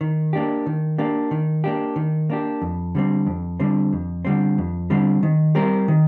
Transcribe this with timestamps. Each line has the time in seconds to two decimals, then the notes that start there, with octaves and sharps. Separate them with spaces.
0.01 D#3
0.33 A#3 D4 G4
0.66 D#3
0.98 A#3 D4 G4
1.31 D#3
1.64 A#3 D4 G4
1.96 D#3
2.30 A#3 D4 G4
2.62 F2
2.95 D3 G3 C4
3.26 F2
3.60 D3 G3 C4
3.93 F2
4.25 D3 G3 C4
4.58 F2
4.90 D3 G3 C4
5.23 D#3
5.55 G3 C4 G4 A#4
5.88 D#3